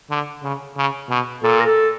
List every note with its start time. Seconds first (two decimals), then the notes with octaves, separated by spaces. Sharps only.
0.10 D3
0.43 C#3
0.77 C#3
1.09 B2
1.43 A#2 A4
1.60 A#4
1.65 A4